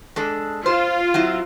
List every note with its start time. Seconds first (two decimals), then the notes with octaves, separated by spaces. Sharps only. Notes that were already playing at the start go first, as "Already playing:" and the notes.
0.16 G#3 D4 A4
0.66 F4 C5
1.14 F#3 C4 E4